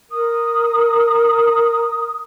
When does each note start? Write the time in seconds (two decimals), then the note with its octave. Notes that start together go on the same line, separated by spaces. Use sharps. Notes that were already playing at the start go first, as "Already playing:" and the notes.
0.11 A#4 D#6